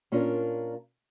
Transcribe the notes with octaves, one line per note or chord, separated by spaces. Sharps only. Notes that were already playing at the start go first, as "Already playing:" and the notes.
A#2 C#4 D4 F4 A#4